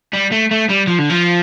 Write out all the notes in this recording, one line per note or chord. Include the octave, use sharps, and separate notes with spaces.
G3
A3
A3
G3
F3
D3
F3